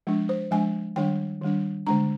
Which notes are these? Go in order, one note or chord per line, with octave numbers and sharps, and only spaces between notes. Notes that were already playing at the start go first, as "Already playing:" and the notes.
F3 G#3 D4
C5
F3 G#3 D4 G#5
D#3 G3 D4 G5
D#3 G3 D4
D3 G#3 D4 A#5